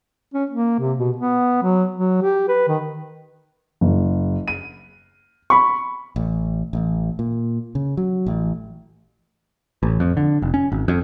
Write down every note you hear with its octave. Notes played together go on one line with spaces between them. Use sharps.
C#4
A#3
C3
B2
B3
F#3
F#3
G4
B4
D#3
F#1
D#7
B5 C#6
A1
A1
A#2
C#3
F#3
A1
A1
F2
D3
F1
C#4
G#1
F2